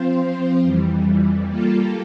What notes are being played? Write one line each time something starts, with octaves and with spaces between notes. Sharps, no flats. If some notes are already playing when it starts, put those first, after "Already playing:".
Already playing: F3 C4 F4 C5
F2 E3 G3
G3 A#3 F4 A4